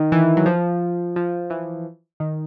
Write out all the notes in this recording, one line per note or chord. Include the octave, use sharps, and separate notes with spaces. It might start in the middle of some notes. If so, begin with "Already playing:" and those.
Already playing: D#3
E3
F#3
F3
F3
E3
D#3